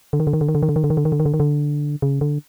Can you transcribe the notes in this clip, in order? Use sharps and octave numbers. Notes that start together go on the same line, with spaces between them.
D3
D#3
D3
D#3
D3
D#3
D3
D#3
D3
D#3
D3
D#3
D3
D#3
D3
D#3
D3
D#3
D3
C#3
D3